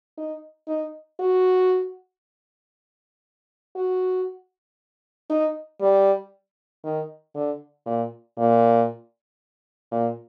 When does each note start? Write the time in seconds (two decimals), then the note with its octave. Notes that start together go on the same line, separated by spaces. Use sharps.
0.17 D#4
0.68 D#4
1.20 F#4
3.76 F#4
5.30 D#4
5.81 G3
6.84 D#3
7.35 D3
7.86 A#2
8.38 A#2
9.92 A#2